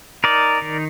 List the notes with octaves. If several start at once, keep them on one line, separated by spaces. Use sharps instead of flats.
D#4 A#4 D5
D#3